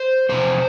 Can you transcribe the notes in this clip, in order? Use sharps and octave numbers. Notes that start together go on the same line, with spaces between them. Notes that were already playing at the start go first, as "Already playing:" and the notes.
Already playing: C5
E2 C3 F3 C5